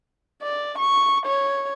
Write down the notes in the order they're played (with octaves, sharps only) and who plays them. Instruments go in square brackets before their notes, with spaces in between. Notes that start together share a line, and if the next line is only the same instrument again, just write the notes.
[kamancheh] D5
C#6
C#5